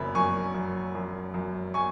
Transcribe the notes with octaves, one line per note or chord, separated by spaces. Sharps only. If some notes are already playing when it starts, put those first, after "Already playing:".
Already playing: F#1 F#2 B5
F#2 G#5 C#6
F#2
F#2
F#2
G#5 C#6